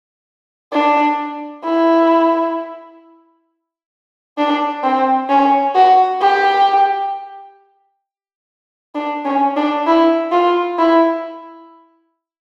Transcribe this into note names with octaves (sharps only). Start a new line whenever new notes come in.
D4
E4
D4
C4
C#4
F#4
G4
D4
C#4
D4
E4
F4
E4